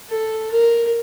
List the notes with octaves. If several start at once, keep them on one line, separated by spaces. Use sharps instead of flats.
A4
A#4